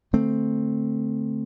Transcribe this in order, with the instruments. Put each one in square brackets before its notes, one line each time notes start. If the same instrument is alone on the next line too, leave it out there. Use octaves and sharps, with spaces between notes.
[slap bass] D3 A3 C4